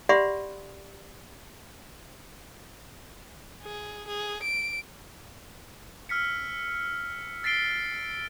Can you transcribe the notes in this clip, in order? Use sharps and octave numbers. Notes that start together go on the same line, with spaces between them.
G4 D5 E5 F#5 B5 C6
G#4
G#4
D7
E6 F6 B6 C#7
E6 A6 B6 C7 D7 G7